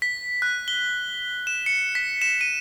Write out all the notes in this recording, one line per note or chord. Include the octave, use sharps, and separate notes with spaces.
B6
F#6
G7
E7
C#7
B6
E7
D#7